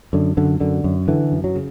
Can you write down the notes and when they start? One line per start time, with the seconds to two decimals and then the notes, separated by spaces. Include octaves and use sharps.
0.13 F#2 D3
0.37 F#2 D3
0.61 F#2 D3
0.84 F#2
1.08 D3 E3
1.32 F#2
1.44 F#3
1.56 C#3